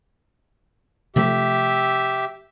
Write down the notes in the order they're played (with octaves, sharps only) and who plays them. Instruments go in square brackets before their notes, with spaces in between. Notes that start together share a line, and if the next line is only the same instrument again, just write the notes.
[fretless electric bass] C3 F3 A3 [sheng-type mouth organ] G4 E5